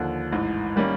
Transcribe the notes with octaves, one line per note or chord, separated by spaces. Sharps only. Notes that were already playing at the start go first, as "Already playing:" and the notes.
Already playing: D#2 D3 F3
A1 G#2 E3
D#3 G3 A#3 C#4